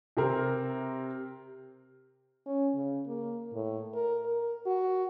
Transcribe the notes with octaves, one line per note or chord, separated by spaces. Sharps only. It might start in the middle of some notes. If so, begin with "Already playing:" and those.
C3 C4 A#4
C#4
C#3
A#3
A2
A#4
A#4
F#4